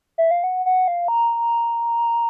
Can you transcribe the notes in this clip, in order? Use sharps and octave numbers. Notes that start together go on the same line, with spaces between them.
E5
F5
F#5
F#5
F5
A#5